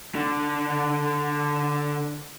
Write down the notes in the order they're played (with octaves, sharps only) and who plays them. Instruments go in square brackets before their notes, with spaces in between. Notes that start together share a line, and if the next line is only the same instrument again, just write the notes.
[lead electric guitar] D3 D4